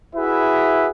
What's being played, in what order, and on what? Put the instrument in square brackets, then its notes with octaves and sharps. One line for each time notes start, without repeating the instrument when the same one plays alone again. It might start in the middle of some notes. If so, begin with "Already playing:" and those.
[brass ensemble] E4 F#4 G#4 B4 E5